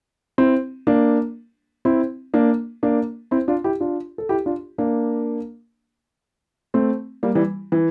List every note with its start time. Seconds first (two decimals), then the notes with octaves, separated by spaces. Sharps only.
0.38 C4 E4
0.87 A#3 D4
1.85 C4 E4
2.34 A#3 D4
2.83 A#3 D4
3.31 C4 E4
3.48 D4 F4
3.64 E4 G4
3.80 D4 F4
4.18 A4
4.29 E4 G4
4.46 D4 F4
4.78 A#3 D4
6.74 A3 C4
7.23 G3 A#3
7.35 E3 G3
7.72 E3